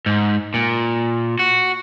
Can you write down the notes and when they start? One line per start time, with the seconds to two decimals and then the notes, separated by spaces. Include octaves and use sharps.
0.06 G#2
0.54 A#2
1.39 F#4